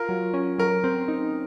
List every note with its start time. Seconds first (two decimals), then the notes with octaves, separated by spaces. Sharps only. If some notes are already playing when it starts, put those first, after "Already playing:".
Already playing: F4 A#4
0.09 F#3
0.34 C#4
0.58 F#3 A#4
0.84 C4
1.08 D#4